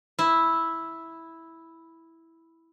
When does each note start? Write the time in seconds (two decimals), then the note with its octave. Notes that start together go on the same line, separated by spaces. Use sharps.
0.19 E4 E5